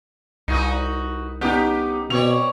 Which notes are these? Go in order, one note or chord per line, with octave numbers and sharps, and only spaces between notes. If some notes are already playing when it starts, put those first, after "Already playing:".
C2 D#4 F#4 B4
B3 C#4 D#4 G4
B2 C4 C#5 D5 F7